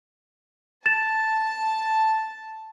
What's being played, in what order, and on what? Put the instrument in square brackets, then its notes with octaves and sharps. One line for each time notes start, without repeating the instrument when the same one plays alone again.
[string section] A5 [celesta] A6 E7